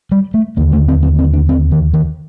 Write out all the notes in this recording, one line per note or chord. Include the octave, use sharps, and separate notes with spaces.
G3
A3
D#2 D3 A#3
A3
C4
C4
C4
D4
C4
D#3
D#3